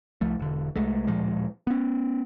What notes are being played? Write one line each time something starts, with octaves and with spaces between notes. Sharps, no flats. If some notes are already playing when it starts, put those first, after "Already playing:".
C2 F3 A3
E1 D3
C2 G#3 A3
D1 A#2 F3 G#3
B3 C#4